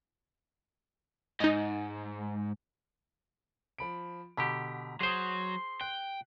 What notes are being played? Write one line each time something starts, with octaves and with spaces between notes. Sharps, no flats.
G#2 D#4 D#5
F3 B5 D7
B2 D3 G4 A#5 B6
F#3 G#4 C5 C6 D#6 C7
G5 F#6